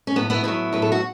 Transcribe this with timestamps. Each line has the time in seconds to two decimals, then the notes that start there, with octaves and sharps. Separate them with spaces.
0.07 C#4
0.16 A2 F#3 B3
0.30 B3 E4
0.44 A2 F#3 B3 E4
0.72 A2 F#3 B4
0.82 A4
0.92 F#4